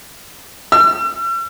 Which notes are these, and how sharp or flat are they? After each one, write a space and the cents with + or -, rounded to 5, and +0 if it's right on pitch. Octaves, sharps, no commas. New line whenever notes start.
E6 +45